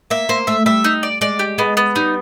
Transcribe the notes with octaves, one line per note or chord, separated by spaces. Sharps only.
A#3 E5
A#3 C5
A3 E5
G3 E5
D#4
D5
G#3 D5
G4
G#3 B3
B3
G3 D#4